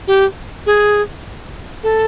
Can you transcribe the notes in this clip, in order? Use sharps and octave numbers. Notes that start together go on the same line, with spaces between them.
G4
G#4
A4